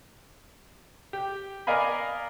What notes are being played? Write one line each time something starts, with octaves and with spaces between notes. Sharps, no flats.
G4
A#4 D5 D#5 F5 G#5 B5